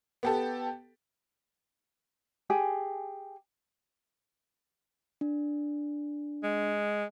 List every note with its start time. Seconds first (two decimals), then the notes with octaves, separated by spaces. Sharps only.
0.23 B3 G4 A4
2.50 G4 G#4 G#5
5.21 D4
6.44 G#3